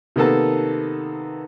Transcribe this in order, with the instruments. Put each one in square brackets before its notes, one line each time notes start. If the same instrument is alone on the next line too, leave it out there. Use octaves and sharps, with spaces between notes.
[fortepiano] C3 D#3 A#3 B3 A4 A5